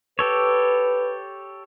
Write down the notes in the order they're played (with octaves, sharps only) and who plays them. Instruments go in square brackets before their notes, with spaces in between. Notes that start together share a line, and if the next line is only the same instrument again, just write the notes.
[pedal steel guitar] G4 A4 C#5 [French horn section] B4